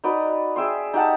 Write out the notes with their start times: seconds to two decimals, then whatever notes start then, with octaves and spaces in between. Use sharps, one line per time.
0.04 D#4 F#4 B4 D5
0.56 G#4 E5 G5 C6
0.94 D#4 G4 F#5 A5